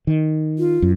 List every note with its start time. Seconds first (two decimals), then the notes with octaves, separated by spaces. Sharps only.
0.07 D#3
0.59 F4
0.82 F#2